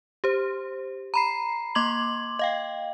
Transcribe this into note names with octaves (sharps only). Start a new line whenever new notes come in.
G4 C5
A#5 B5 C7
A#3 C6 D6 G#6 F#7
D#5 F5 G5